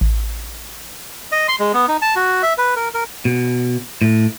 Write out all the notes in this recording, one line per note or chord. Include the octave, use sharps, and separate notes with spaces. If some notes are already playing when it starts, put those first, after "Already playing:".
A1
D#5
C6
G#3
B3
D#4
A5
F#4
E5
B4
A#4
A#4
B2
A2